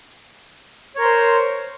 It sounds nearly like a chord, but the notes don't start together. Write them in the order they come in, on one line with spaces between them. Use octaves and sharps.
C#5 A#4 C6 C5